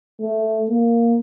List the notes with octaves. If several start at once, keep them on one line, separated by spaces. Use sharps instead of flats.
A3
A#3